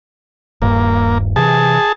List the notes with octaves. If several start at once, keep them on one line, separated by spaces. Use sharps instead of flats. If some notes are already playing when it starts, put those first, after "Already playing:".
D#1 G2 A#3
C3 E3 G#4 A5